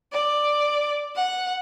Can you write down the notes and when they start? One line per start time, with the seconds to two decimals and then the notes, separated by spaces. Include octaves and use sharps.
0.12 D5
1.15 F#5